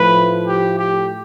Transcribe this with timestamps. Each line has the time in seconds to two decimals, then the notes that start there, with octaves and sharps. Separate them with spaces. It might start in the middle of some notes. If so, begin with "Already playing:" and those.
Already playing: A2 F3 A3 B4
0.47 G4
0.78 G4